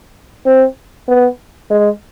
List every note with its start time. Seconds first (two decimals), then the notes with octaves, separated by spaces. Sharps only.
0.46 C4
1.08 B3
1.70 G#3